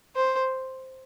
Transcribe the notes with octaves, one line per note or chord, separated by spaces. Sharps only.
C5